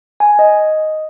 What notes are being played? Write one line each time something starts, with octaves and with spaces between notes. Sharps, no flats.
G#5
D#5